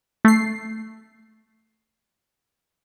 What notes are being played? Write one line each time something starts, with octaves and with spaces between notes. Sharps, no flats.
A3 C7